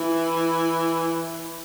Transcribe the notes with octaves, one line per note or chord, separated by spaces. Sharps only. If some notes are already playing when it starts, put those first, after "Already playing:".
Already playing: E3